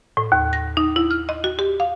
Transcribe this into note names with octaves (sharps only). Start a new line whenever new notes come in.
A2
D#2
A#6
D#4
E4
F6
D#5
F#4
G4
F5